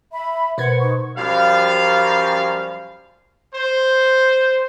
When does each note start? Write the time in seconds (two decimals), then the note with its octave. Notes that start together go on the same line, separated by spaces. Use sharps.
0.12 E5 B5
0.58 B2 B4 C5 F#5 G#6
0.79 D#4 C#6
1.17 F#2 F3 G3 F5
3.54 C5